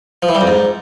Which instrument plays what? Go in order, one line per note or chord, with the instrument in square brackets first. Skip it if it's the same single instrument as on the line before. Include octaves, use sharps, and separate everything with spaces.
[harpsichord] F3
E3
G3
F2
G#2